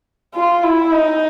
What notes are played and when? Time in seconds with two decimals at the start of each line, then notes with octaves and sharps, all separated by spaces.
0.35 F4
0.63 E4
0.92 D#4